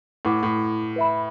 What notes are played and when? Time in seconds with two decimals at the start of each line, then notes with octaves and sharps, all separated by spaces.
0.25 A2 E4 B4 F#5 D6
0.43 A2
0.96 B4 E5 B5